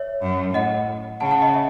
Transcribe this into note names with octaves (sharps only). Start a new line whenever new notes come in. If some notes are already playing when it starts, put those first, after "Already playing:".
Already playing: C#5 E5
F#2
A2 D#5 F#5
C#3 F#5 A5
F#5 A5
D#5 F#5
C#5 E5